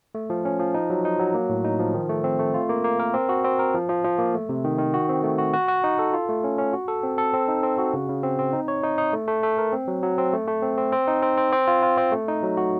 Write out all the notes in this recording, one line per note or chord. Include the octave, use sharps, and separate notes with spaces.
A3
F3
C#4
F3
D#4
F#3
D#4
F#3
A#3
A2
D#4
F3
D#3
A3
C4
A3
F4
A#3
A#3
A#4
C4
F#4
C4
A#4
F3
F3
F3
A#3
A3
C3
D#3
D#3
F#4
C4
A3
F#4
F#4
F#4
D#4
A4
F4
A3
C#4
C#4
F#4
A4
C4
A4
C4
D#4
C4
F#4
C#3
C#3
C4
C4
D#4
C#5
D#4
D#4
A3
A3
A3
A#4
C4
F#3
F#3
C4
A3
A3
C4
C4
C4
D#4
C4
C4
C4
F4
F4
C4
A3
D#4
F#3
F#4